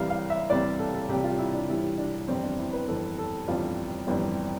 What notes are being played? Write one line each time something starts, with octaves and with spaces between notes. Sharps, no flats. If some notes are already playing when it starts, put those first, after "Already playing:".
Already playing: C2 C3 E3 G3 F5
F5
E5
C2 C3 E3 G3 D5
A4
A4
C2 C3 E3 G3 G4
F4
E4
D4
C2 C3 E3 G3 E4
D4
G1 F2 E3 G3 C4
D4
E4
B4
G1 F2 E3 G3 A4
A4
G1 F2 E3 G3 F4
G1 F2 E3 G3